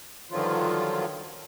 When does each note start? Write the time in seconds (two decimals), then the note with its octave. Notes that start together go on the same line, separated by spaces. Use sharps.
0.31 G2 D3 D#3 F3 F#3 F4